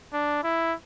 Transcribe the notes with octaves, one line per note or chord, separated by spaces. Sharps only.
D4
E4